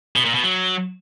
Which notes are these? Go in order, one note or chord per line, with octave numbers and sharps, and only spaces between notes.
B2
A#2
B2
F#3